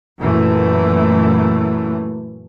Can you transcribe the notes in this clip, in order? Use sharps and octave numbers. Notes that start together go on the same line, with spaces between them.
F#2 A#2 E3 A3